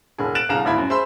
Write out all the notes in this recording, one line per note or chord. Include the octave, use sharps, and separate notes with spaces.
E1 D3 G#4
F#6 A6 D7 E7 F#7
C2 D3 G#4 F5 A#5 E7
G#1 D2 E4 F5 B5 G#6
F#2
G#4 C5 E5 B5 C6 E6